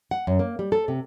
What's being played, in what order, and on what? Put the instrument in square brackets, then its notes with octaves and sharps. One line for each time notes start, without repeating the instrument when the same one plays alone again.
[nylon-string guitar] F#5
F#2
A#3
G3
A4
C3